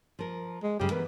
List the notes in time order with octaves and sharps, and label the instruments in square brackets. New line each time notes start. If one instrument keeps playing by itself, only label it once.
[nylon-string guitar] F3 A#4
[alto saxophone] G#3
[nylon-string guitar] F#2 C#3 G5 [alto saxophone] G4
[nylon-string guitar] E3 B3 [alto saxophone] A#4